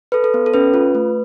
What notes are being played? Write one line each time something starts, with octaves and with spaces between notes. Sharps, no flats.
A4 B4
A4
B3
A4
C#4 B4
F4
A3